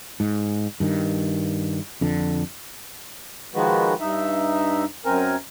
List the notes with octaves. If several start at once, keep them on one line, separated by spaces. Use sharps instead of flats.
G#2
G2 D#3
F2 D3
D#3 F3 G#3 F#4 B4
G2 D#4 E5
F#2 C4 A#4 G#5